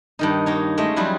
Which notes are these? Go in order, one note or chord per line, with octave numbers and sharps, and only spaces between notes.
G2 D#3 D#4
A#3 D#4 C#5
G#3 A3 C#4 D#5
F2 F#3 G3 E4 F4 G#4